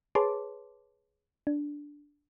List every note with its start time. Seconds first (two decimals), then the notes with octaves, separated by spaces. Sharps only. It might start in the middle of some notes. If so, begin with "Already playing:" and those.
0.15 G#4 B4 C#5 A5 C6 D6
1.47 D4